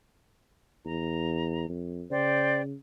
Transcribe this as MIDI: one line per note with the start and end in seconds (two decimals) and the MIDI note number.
0.85 1.65 40
0.85 1.67 82
1.69 2.05 41
2.10 2.75 49
2.10 2.61 72
2.10 2.61 74
2.10 2.61 79